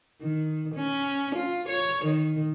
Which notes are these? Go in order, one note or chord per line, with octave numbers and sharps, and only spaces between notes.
D#3
C#4
F4
C#5
D#3